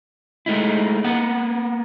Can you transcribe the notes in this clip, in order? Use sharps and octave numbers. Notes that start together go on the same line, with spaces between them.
G#3 A3 D#4 E4
A#3 B3 F#5